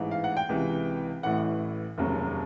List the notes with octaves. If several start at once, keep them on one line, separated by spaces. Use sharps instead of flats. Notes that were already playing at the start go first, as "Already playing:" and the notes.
Already playing: A1 G#2 E3
F5
F#5
G5
C#2 C3 E3
A1 A2 E3 F#5
F1 D#2 C#3 F#3